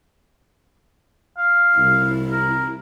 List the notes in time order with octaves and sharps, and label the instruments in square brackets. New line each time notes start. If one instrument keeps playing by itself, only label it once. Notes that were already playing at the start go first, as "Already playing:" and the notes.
[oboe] F5
[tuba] C2 [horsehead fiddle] E4
[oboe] A#4